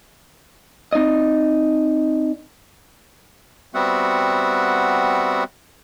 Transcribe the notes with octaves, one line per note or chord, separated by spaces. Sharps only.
C4 D#4 D5 D#5
G3 B3 C4 F#4 E5 F#5